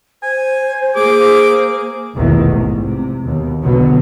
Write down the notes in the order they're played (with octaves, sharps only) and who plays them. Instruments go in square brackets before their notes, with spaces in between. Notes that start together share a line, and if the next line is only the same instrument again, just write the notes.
[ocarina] C5 [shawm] G#5
[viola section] A#3 G#4 [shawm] D6
[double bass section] F1 A#1 E2 G2 B2 D#3
G#2
C3
D#2 B2
B1 E2 B2 D3 F#3 B3